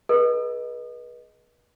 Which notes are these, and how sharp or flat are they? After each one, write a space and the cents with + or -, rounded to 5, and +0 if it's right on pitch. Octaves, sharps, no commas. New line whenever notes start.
G#4 +20 B4 -35 D#5 +0